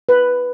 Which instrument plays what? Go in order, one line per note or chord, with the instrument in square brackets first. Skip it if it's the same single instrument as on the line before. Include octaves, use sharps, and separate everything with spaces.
[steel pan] B4